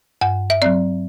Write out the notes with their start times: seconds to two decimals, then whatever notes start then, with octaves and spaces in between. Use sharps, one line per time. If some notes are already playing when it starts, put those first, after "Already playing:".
0.21 G2 F#5
0.50 E5
0.62 F#3 C4 D5